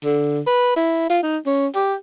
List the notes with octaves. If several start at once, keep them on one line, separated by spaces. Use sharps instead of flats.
D3
B4
E4
F4
D#4
C#4
G4